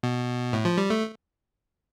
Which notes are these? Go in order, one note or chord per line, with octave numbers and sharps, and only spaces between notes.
B2
A2
F3
G3
A3